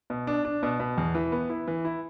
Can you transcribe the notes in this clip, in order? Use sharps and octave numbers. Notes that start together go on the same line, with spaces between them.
B2
D4
D4
B2
B2
E2
E3
B3
E4
E3
E4